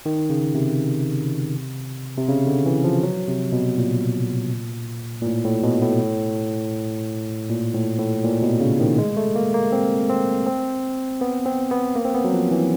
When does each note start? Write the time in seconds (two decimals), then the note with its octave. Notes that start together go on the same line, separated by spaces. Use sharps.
0.06 D#3
0.30 C#3
0.55 C3
2.17 C3
2.28 C#3
2.47 D3
2.66 E3
2.84 F3
3.03 F#3
3.28 C3
3.52 B2
3.77 A#2
5.21 A#2
5.26 A2
5.45 A2
5.63 B2
5.82 A2
7.49 A#2
7.74 A2
7.99 A2
8.24 A#2
8.42 B2
8.61 C#3
8.80 D#3
8.98 G#3
9.17 A3
9.36 A#3
9.54 A#3
9.72 C4
10.10 C4
10.47 C4
11.21 B3
11.46 C4
11.71 B3
11.96 A#3
12.05 C4
12.14 B3
12.24 F#3
12.33 F3
12.51 E3